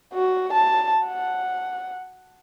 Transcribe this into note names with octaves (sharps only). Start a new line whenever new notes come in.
F#4
A5
F#5